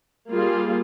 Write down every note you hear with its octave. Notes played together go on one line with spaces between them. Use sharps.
G3 A#3 F4 G#4